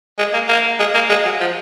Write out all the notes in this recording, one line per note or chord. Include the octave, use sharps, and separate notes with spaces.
G#3
A#3
A#3
G#3
A#3
G#3
F#3
F3